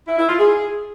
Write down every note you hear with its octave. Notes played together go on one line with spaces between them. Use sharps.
E4
E4
F4
G#4